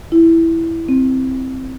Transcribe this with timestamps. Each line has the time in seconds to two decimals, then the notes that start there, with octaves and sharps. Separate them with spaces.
0.12 E4
0.89 C4